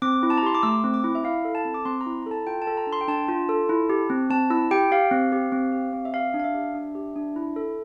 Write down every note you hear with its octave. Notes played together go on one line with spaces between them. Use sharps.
C4 D6
E4
A5
A#5
G4 C6
D6
A3 E6
C4
D6
E4
E5
E4 F5
A4
A5
C4
D6
C4 C6
A#5
E4
A4 A#5
A5
F4 G5
A5
A4
A#5
D4
C6
G5
D4 A5
F4
A4
E4
G4
C4
C4 A5
E4 E6
G4 G5
G4 F5
C4
G4
C4
G4
C4
E5
G4 F5
D4
F5
E5
G4
D4
G4
D4
E4
A4